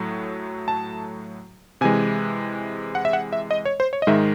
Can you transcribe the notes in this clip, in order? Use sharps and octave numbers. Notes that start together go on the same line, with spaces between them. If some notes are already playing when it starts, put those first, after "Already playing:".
Already playing: A2 F#3 A3
A5
C3 E3 G#3 G#5
F#5
E5
F#5
E5
D#5
C#5
C5
C#5
D#5
G#2 D#3 G#3 E5